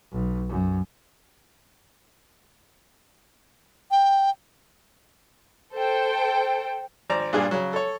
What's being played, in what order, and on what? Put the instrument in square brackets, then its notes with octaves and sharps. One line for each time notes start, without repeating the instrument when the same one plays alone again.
[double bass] B1
F#2
[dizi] G5
[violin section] A4 C5 G5
[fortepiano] G#1 C5 D5 A#5
G2 A#2 D4 G#4 D5
C#3 F#3
A4 C#5